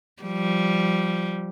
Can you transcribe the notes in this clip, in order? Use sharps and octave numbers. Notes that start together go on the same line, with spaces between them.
F3 G3